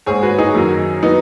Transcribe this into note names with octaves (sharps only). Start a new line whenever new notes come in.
G#2 G#3 G#4 C#5
F#4 B4
D#4 G#4
F#2 D#3 F#3
F#3 B3 D#4